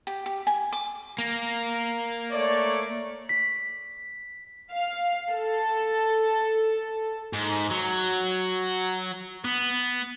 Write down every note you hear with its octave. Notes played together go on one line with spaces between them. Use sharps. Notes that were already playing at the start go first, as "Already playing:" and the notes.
G4
G4
G#5
D6
A#3
A3 C#5 D5
B6
F5
A4
G#2
F#3
B3